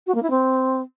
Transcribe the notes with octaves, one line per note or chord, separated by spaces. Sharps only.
F#4
A#3
E4
C4